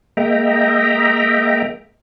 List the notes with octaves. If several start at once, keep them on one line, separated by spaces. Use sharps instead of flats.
G#3 A#3 D#5 E5 G5 A#5